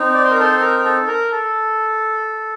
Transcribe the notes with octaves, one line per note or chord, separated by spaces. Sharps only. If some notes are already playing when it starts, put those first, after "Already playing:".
Already playing: C4 D#4
D5
C5
A#4
A4 C5
A#4
A4
A#4
A4